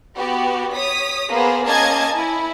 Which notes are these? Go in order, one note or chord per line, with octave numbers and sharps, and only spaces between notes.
B3 F#4 G4
C#5 D#6 B6
A#3 B3 G#4 C5
A#3 C#4 D#5 G#5 A5 G#6
E4